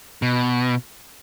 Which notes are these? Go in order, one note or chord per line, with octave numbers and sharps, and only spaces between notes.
B2